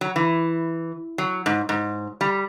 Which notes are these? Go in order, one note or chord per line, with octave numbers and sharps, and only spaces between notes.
F#3
E3
F#3
G#2
G#2
G3